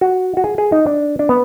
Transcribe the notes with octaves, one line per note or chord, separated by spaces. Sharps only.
F#4
F#4
G#4
G#4
D#4
D4
D4
B3